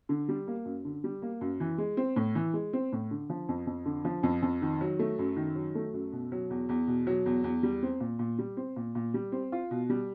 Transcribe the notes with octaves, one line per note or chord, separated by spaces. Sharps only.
D3
G3
A#3
F#2
D3
G3
A#3
F#2
E3
G#3
C4
A2
E3
G#3
C4
A2
D3
F3
F2
F2
D3
F3
F2
F2
D#3
F#3
A3
F#2
D#3
F#3
A3
F#2
B2
F#3
E2
E2
B2
F#3
E2
E2
G3
C4
A#2
A#2
G3
C4
A#2
A#2
G3
C4
F4
B2
G3